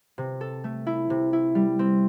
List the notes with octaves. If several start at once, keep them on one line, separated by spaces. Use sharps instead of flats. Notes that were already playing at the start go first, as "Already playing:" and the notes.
C3
A4
A3
E4
C3
E4
G3
C4